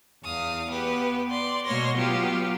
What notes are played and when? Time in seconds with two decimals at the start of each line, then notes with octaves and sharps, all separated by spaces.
0.25 E2 F5 D#6
0.70 B3 G4 B4
1.29 D5 C6
1.65 B2 A#3 C#5 C6 A#6
1.96 F#3 B3 F4 G4